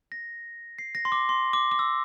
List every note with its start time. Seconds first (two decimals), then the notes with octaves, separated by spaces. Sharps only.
0.12 A#6
0.79 C7
0.95 A#6
1.05 C6
1.12 D6
1.29 C6
1.53 D6
1.71 D6
1.79 E6